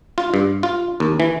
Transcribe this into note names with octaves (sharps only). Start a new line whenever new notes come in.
F4
G2
F4
D#2
E3